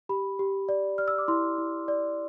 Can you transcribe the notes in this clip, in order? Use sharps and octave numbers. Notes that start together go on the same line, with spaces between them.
G4 B5
G4
D5
D5 F6
E6
D6
E4 C6
E4
D5